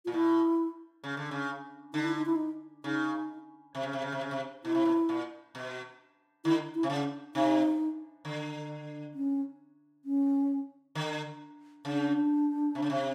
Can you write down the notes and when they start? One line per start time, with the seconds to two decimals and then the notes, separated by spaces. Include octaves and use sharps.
0.05 A#2 F4
0.14 B2 E4
1.04 C#3
1.17 D3
1.31 C#3
1.93 D3 D#4
2.05 E4
2.15 D#4
2.26 E4
2.36 D#4
2.84 C#3 D#4
3.75 C3
3.83 C#3
3.93 C3
4.02 C#3
4.12 C3
4.21 C#3
4.31 C3
4.64 B2 E4
4.75 C3
4.85 B2
5.09 A#2
5.55 B2
6.45 D3 E4
6.74 E4
6.83 C3
6.90 C#3
7.35 C3 D#4
8.25 D3
9.14 C#4
10.05 C#4
10.95 D3
11.85 C#3 D4
12.75 C3
12.82 C#3
12.90 C3